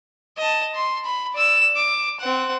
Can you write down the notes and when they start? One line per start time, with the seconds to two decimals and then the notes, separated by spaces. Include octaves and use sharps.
0.38 D#5 A5
0.75 C6
1.04 B5
1.34 D5 E6
1.76 D6
2.20 C4 F#5